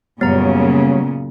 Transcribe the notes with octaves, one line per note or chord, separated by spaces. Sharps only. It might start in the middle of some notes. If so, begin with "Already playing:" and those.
F#2 A#2 C#3 G3 B3 C#5 A#5